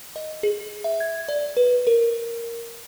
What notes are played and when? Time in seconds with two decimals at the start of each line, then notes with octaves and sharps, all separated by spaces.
0.16 D#5
0.43 G#4
0.84 E5
1.00 G#6
1.29 D5
1.57 B4
1.87 A#4